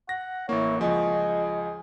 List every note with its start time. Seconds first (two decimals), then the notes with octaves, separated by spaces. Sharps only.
0.09 F#5 A#6
0.49 A1 A#3 E4 C#5
0.81 C#2 F3 G#4 D#5